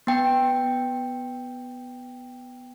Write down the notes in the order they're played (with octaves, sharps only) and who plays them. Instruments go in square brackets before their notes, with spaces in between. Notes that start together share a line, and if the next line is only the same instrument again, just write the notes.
[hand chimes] B3 G5